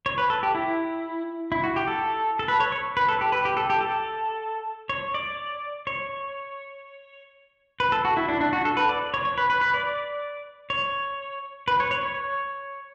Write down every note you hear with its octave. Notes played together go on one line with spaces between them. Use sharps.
C#5
B4
A4
G4
E4
E4
F#4
G4
A4
A4
B4
C#5
C#5
B4
A4
G4
B4
G4
A4
G4
A4
C#5
D5
C#5
B4
A4
F#4
E4
D4
D4
F#4
A4
B4
D5
C#5
C#5
B4
B4
B4
D5
C#5
B4
C#5
C#5
C#5